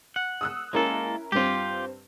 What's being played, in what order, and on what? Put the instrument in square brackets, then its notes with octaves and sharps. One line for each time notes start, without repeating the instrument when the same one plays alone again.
[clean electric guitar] F#5
[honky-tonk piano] D#6 E6 F#6
[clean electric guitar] G#3 A#3 A4 [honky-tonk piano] C#4 E4 A#4
[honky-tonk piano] G2 C4 [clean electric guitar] F4 G4